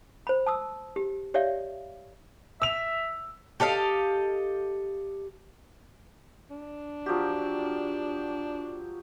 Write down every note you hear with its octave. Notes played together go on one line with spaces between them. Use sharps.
C5 B5
A5 D#6 E6
G4
G4 C#5 D5 E5 F5
E5 E6 F7
G4 A4 D#5 F5
D4
F3 F#3 G4